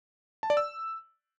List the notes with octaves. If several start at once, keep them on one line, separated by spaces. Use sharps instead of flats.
A5
D5
E6